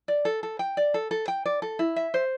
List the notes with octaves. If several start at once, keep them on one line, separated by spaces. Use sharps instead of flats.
D5
A4
A4
G5
D5
A4
A4
G5
D5
A4
E4
E5
C5